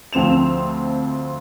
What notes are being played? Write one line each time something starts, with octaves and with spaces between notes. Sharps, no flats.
D2 F3 C4 E7 F7